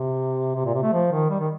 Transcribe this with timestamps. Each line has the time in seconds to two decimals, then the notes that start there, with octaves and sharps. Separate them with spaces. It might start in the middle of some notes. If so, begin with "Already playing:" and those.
Already playing: C3
0.55 C3
0.65 A#2
0.74 C3
0.83 A3
0.93 F3
1.12 D#3
1.30 G3
1.40 D#3